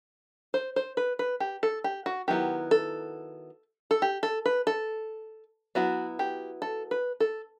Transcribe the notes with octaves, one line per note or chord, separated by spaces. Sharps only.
C5
C5
B4
B4
G4
A4
G4
F#4
D#3 F#3 B3 E4 G4
A4
A4
G4
A4
B4
A4
F#3 B3 E4 F#4
G4
A4
B4
A4